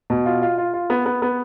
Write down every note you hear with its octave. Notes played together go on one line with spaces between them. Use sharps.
B2
F4
F4
F4
F4
B3
B3
B3